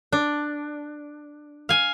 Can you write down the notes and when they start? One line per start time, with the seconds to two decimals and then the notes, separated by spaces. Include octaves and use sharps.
0.12 D4
1.69 F5 G#5